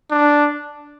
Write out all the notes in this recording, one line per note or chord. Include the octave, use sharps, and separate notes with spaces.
D4